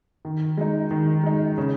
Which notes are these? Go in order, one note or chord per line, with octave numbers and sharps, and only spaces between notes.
D#3
G#3 D#4
D#3
G#3 D#4
C#3